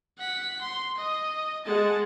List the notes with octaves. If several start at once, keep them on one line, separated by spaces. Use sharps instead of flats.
F#5 B6
C6
D#5 D#6
G#3 F#5 A5